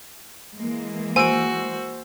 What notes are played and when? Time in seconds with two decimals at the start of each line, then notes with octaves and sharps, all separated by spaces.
0.57 E3 G#3 A#3
1.16 F#4 C5 G#5 E6 D7